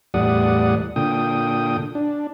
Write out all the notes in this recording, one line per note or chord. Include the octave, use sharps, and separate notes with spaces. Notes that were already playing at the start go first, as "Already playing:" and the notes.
E2 A2 G3 D5 F#5 D#6
A#2 D3 G5 D#6
D4